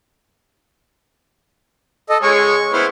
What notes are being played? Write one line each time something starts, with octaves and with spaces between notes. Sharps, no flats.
A4 D#5
G#3 G#4 C#5 C#6
B3 E4 C5 F6